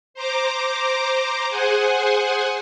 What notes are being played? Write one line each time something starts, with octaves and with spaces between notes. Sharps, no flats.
C5 A#5 D6
G#4 C5 F#5 G#5